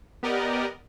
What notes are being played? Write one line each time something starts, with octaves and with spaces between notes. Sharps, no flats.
B3 G4 A#4 D5 D#5 F#5